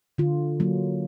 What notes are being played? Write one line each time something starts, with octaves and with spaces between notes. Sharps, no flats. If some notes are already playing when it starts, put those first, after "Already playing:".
D3 F4
F#3 A#3